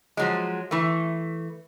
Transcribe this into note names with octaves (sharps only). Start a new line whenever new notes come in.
F3 F#3 G#3
E3 A3